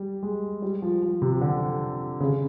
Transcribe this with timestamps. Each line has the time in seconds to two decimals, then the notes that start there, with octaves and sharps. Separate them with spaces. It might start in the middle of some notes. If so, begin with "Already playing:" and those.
Already playing: G3
0.23 G#3
0.62 G3
0.82 F3
1.02 F3
1.22 C3
1.41 D3
2.20 C#3